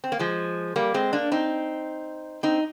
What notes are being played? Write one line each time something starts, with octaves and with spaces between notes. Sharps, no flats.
C4
A#3
F3 G#3
G3 A#3
G#3 C4
A#3 D4
C4 D#4
C4 D#4